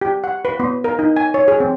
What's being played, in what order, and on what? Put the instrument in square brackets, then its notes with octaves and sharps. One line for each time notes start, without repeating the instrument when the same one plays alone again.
[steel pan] G4
F#5
B4
B3
A#4
D#4
G#5
C#5
G#4
C4